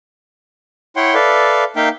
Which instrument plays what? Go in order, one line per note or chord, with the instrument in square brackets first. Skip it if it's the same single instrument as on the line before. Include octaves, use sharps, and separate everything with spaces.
[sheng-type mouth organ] E4 C#5 F#5 G5 C6
A4 B4 D5 E5 F5
A#3 D#4 E5 F5 G5